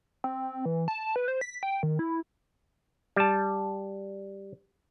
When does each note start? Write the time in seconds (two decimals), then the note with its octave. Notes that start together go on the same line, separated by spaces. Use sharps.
0.24 C4
0.65 E3
0.88 A5
1.16 B4
1.28 C5
1.41 B6
1.63 G5
1.83 D#3
1.99 E4
3.16 G3 A5